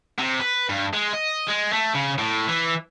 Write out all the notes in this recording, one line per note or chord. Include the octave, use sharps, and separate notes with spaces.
C3
B4
G2
G#3
D#5
G#3
A3
C#3
A2
E3